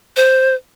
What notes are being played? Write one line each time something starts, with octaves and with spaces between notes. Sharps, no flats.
C5